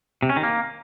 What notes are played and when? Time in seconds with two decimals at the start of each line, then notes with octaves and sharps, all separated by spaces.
0.23 C3
0.29 C#4
0.36 D#3
0.43 A#3